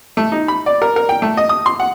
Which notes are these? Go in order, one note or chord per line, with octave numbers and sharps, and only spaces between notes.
A3
D#4
B5
D5
A#4
A#4
G5
A3
D#5
D#6
C6
F#5